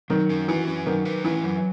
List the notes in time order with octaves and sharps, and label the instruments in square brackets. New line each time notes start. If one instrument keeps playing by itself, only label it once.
[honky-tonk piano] D#3 [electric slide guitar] F#3
[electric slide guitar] C#4
[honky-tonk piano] E3 [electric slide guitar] F#4
[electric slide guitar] C#4
[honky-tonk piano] D#3 [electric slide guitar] F#3
[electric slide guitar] B4
[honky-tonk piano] E3 [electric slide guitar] C#4
[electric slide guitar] F#3